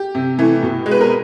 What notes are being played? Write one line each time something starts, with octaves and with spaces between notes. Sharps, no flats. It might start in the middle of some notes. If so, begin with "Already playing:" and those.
Already playing: G4
C3
E3 A3
B2
G#3
B4
A#4